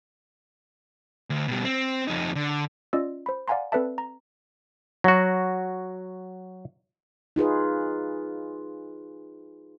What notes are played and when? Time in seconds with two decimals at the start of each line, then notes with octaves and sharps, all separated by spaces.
1.30 D2
1.47 B2 G3
1.65 C4
2.08 F2 D#4
2.35 D3
2.93 C#4 F4 D5 D#5 E6
3.26 C5 B5
3.48 D5 F5 F#5 G#5 A#5 C6
3.72 C4 A4 B4 D5 E5 A5
3.98 A#5
5.04 F#3 F#4
7.36 D#4 F4 G#4 B4